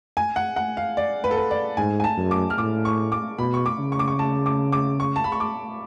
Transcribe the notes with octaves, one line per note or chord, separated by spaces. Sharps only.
G#5
F#5
F#5
F5
D5
B4
A4
B4
D5
G#2 G#5
G#5
A5
F#2
D6
F6
A2 D6
C#6
D6
B2 B5
C#6
D6
C#3
C#6
D6
C#6
A5
D6
D6
C#6
A5
B5
C#6
D6